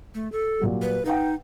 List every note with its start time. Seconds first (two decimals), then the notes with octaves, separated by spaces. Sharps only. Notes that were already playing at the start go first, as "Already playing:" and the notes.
0.15 A3
0.32 A4
0.59 A#2 F#3 G3
0.82 B4
1.05 D#4 B4 F#5 G5